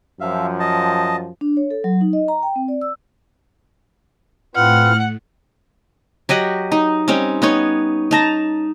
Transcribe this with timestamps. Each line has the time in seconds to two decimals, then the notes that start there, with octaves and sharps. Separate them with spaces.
0.20 F#2 F3 E5 F5
0.59 D#5 A5
1.41 D4
1.57 C#5
1.71 A4
1.84 F#3
2.01 D#4
2.13 D#5
2.28 A#5
2.43 G5
2.56 C4
2.68 D5
2.81 E6
4.55 A2 C4 F4 B4 F#5 F6
6.29 F#3 G4 D#5 F#5
6.72 D#4
7.08 G3 C4 C#4 D#4
7.42 B3 D#4 C#5
8.11 D#4 A5 A#5